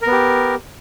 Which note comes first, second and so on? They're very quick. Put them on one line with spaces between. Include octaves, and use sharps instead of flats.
A#4 B3 G4